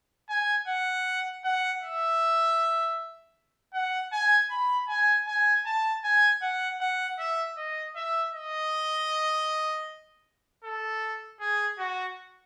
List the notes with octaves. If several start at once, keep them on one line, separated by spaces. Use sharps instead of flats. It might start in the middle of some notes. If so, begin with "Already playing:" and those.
G#5
F#5
F#5
E5
F#5
G#5
B5
G#5
G#5
A5
G#5
F#5
F#5
E5
D#5
E5
D#5
A4
G#4
F#4